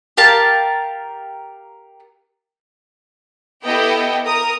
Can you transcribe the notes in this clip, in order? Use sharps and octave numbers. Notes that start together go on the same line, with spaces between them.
G4 A#4 F5 A5
B3 E4 G4 A4 D#5 G5
A#4 D#6